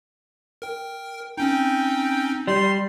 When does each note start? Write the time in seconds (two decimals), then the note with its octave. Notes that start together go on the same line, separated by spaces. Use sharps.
0.62 A#4 G5
1.37 C4 C#4 D#4 G5
2.47 G3 C6